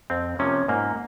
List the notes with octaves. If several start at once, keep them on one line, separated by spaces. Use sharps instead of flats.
F2 C4
C3 F3 A#3 C#4
G#2 A#3